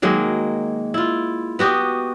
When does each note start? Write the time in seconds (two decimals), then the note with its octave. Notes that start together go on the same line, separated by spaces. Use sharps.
0.02 D#3 F#3 G#3 A#3
0.94 E4 F4
1.59 B3 F#4 G4 D#5